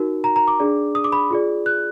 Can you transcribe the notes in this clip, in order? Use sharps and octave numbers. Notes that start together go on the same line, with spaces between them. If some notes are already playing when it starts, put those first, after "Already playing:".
Already playing: D#4 F#4 A#4
A#5
A#5
D6
D4 G#4 D5
D#6
D6
B5
F4 G#4 D5
F#6